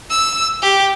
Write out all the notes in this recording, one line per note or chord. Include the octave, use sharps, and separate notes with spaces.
E6
G4